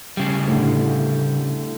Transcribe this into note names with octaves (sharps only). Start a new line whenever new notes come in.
C#3 G3
A2 D3